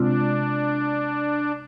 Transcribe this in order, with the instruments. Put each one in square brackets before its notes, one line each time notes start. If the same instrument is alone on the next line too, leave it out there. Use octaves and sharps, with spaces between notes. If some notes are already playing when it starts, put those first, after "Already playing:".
Already playing: [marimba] C3 G#3 C4 F4 [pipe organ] D4